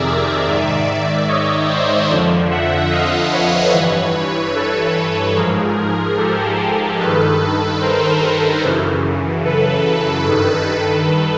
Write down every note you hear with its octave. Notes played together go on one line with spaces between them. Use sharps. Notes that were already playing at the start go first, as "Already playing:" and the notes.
Already playing: F2 C3 D#3 G#4 A#4 D5 E5
G#2 D#3
C#5 D#5
C5 D5
F2 D3 F3
E5 F#5
D#5 F5
B4 C#5
G2 E3 B4 C#5
A4 B4
G#2 F3 G#4 A#4
G4 A4
G2 D#3 A4 B4
A#4 C5
F#2 C#3 E3
A4 B4
G2 D#3